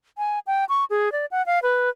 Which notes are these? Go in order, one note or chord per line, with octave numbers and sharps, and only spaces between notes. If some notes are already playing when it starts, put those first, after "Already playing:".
G#5
G5
C#6
G#4
D5
F#5
F5
B4